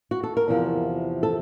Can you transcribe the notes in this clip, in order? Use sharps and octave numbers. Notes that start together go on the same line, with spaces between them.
F#4
A4
A#4
E2 C3 F3
A4